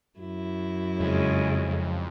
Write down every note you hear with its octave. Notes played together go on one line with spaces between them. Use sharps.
F#2 E4
F2 C#3 G#3